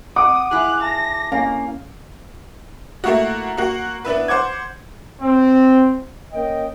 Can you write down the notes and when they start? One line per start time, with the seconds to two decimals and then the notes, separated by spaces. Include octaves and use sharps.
0.16 F#5 D6 D#6
0.51 E4 G#4 F5 F#6
0.82 A5 A#6
1.32 A#3 C#4 F5
3.04 A3 A#3 E4 F#4
3.57 A#3 F#4
4.05 B3 D4 E4 B4
4.28 C5 F#5 D6 G#6
5.21 C4
6.33 A#3 C#4 D#5 G5